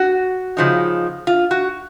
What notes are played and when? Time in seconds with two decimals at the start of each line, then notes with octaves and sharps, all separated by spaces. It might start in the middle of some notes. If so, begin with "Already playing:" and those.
Already playing: F#4
0.57 C#3 F3 G#3 D#4
1.27 F4
1.51 F#4